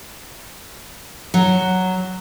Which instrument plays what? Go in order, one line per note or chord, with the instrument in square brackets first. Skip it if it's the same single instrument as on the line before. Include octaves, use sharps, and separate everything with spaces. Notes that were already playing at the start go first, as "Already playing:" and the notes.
[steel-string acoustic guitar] F#3